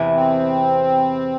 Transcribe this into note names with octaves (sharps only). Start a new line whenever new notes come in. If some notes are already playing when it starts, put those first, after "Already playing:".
Already playing: E2 C3 E3
C4